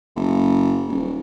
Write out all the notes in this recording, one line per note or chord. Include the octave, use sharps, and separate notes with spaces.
F#1
D#1